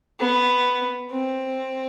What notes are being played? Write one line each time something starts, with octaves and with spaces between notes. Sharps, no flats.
B3
C4